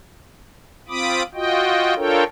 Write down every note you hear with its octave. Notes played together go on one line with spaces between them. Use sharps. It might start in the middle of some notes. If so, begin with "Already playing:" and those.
C4 F4 B5 D6 D#6
F4 F#4 D#5 G5
D4 F4 A4 A#4 C#5 G5